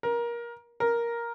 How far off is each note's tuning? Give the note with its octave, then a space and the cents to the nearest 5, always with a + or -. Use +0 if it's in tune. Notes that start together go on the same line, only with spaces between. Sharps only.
A#4 +25
A#4 +10